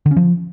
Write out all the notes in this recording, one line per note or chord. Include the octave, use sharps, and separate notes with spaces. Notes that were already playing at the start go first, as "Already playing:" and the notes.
D3
C#4
F3